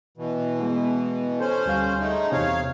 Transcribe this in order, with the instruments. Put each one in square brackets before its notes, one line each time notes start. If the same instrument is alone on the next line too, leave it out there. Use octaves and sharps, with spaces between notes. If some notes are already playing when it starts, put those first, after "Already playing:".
[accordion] B2 E3
[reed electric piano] G#3 B3
[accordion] C#4 C5 [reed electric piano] A4
[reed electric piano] D2 G3 F5
[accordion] G#3 A3 D#4
[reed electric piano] E2 C3 [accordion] C#5 F5